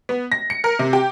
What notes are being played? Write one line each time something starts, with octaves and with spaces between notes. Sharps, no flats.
B3
A#6
C#7
A#4
C3
G4